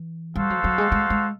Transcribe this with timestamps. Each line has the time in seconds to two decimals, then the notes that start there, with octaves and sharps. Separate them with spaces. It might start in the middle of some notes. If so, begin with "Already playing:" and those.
Already playing: E3
0.36 G3 F#4 A4 C5 F5
0.50 F#3
0.64 F#3
0.78 G#3
0.92 G#3
1.10 G#3